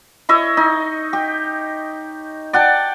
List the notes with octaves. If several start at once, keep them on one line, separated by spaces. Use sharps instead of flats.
E4 C#5 D#5 E5
D#4
G4
D5 F#5 G5 A5